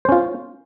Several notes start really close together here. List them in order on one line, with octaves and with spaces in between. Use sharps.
C5 C#4 F4